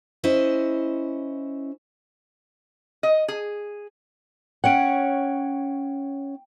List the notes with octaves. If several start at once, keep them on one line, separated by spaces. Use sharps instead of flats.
C#4 E4 C5 D#5
D#5
G#4
C#4 C#5 F#5 G5 D7